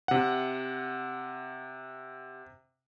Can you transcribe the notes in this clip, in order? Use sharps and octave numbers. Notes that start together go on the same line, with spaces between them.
C3 F#5